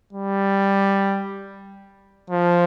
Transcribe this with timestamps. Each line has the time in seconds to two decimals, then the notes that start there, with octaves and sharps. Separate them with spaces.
0.13 G3
2.30 F3